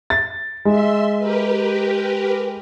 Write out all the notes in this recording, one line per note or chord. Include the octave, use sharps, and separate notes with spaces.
A6
G#3 E5 C6
G4 A#4 B4